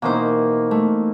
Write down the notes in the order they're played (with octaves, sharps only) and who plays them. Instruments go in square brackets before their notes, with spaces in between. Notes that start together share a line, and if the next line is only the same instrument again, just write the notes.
[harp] B2 E3 C5 [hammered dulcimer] A#3 D#4
[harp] A3